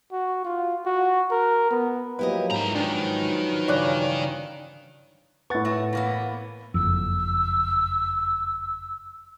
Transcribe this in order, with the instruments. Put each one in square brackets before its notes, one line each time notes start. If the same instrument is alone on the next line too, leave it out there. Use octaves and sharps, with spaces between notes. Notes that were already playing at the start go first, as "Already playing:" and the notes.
[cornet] F#4
F4
F#4
A#4
B3
[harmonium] F3 F#3 A#3 [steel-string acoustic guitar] E4 G4 D#5 [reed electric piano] B4
[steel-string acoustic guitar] G#2 [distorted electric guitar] E4 A#5
[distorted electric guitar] D#3 [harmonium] F3 F#3 B4 [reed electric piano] D4
[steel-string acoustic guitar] G2 C#3 E3 [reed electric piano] C#5 D5 F#6
[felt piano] A2 C#6 [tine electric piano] B4 F#5 A6
[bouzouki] A3 F#4 C#5
E3 A#3 B3
[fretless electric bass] F#1 F2 [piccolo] E6